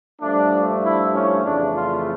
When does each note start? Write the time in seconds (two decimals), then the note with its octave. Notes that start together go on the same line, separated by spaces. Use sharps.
0.20 G2 F3 A3 D4
0.82 E4
1.12 C#4
1.44 F2 C#3 E3 A3 D4
1.74 F4